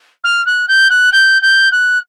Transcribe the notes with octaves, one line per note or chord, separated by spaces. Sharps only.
F6
F#6
G6
F#6
G6
G6
F#6